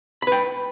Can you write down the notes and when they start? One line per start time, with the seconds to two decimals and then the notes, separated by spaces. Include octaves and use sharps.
0.22 B5
0.27 B4
0.32 G5